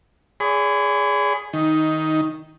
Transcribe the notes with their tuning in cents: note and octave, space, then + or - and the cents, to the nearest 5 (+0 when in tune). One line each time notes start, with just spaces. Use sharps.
G#4 +0 D5 -45 B5 +40
D#3 +10 D#4 +0